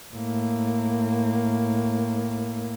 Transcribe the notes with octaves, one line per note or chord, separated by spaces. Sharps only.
A2 A#3